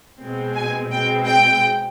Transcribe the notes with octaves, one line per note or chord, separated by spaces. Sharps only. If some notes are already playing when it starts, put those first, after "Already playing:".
B2 G#3 C4
G#5
B2 G#3 C4 G5
G5